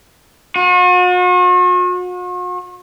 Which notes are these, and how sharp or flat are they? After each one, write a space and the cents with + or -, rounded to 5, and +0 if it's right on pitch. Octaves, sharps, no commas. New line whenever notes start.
F#4 -45